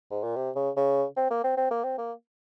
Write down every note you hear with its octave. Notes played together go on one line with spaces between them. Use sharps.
G#2
A#2
C3
C#3
C#3
C4
A#3
C4
C4
A#3
C4
A#3